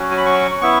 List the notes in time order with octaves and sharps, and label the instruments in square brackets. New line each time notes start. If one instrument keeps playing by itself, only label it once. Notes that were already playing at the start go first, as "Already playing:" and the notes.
Already playing: [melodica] F#3 C#4 F#4
G#5
B5
C#6
B3 E4 C#6